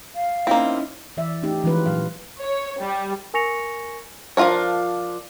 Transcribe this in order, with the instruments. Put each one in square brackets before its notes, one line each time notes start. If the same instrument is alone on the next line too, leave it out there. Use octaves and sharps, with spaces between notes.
[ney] F5
[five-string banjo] A#3 C4 [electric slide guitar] C#4 D#4 E4
[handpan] E3 D5 E5
A3 C#4 D#4 G4
E3 F3 G#3 C#4 F4 B4
A#2 F#3 F5
[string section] C#5
G3
[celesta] A#4 G#5 C#6 A#6 C#7 F7
[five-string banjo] F3 D4 F4 A#4 C#5